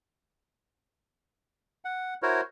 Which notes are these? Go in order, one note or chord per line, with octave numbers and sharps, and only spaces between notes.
F#5
E4 F#4 A#4 C5 C#5